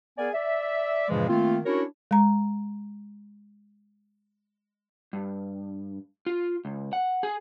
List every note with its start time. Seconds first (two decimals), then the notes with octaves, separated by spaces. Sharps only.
0.18 B3 G#4 A#4 D5 G#5
0.33 D5 E5
1.09 G2 A#2 C#3 E3 F3 G#3
1.28 D#3 A3 A#3 C4 F4
1.66 C#4 D4 E4 F#4 A#4 C#5
2.11 G#3 A#5
5.13 G2
6.26 F4
6.65 C#2
6.93 F#5
7.23 G#4